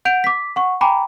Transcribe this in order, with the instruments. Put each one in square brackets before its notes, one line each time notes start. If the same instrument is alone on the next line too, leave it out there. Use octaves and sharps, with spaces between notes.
[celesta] F#5 G6 D7 F7
D6 B6
F#5 C#6
G5 G#5 A#5 B5 D6